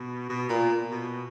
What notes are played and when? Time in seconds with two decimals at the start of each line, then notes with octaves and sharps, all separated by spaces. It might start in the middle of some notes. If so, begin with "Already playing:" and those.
Already playing: B2
0.29 B2
0.49 A#2
0.91 B2